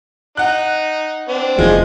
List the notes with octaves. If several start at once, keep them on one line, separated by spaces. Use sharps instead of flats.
D#4 F#5 F#6
C4 D4
F1 E2 F3 G#3 F4